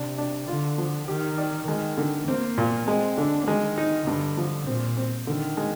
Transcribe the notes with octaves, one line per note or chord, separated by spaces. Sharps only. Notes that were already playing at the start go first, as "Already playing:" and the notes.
Already playing: C3 D4
D4
D3 F4
F3
D#3 G4
D5
D#3 G#3
D3
A#3 C4
A#2
G#3 C4
D3 D4
D#3 G#3
D#4
G2 D3
F3
A#2 C4
C4
D3 D#3
G#3